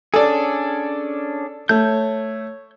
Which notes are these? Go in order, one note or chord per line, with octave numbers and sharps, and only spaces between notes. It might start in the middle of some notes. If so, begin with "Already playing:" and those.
C#4 D4 G#4 A4 D5
A3 C#5 G6